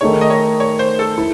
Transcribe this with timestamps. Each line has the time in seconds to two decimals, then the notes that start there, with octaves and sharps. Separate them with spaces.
0.01 D#3 A3 D#4 G#4 C#5
0.21 D#5
0.30 C#5
0.60 C#5
0.79 C5
0.99 A4
1.18 E4